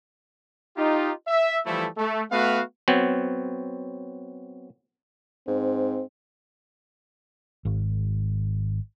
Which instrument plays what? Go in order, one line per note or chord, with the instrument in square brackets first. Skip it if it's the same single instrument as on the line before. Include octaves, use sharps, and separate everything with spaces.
[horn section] D#4 F4 G4
E5
E3 F3 G3 A3 E4 A4
A3
A3 B3 F#4 B4 F5
[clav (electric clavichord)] F#3 B3 C4
[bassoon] G#2 [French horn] C4
[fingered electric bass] G#1